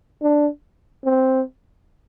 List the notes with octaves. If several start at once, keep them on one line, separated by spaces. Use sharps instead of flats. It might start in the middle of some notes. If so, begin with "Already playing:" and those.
D4
C4